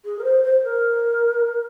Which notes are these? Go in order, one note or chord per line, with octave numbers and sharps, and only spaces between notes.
G#4
A#4
C5
C5
A#4